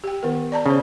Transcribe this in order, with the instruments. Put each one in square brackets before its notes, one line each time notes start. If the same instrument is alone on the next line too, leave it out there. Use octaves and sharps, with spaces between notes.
[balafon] G4 G5
D#3 B3 A#4
D5 A5 A#5
[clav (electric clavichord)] C#3 [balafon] C#4 C5